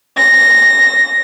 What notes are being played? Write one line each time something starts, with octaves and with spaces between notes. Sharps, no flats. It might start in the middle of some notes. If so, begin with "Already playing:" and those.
A#6